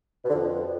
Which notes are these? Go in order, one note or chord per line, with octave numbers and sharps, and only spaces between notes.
B2
D3
F2